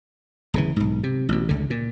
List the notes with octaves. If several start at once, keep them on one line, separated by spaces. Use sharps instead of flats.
D1 C#3 E3
B1 G#2
C3
A1 B2
C#2 D3
A#2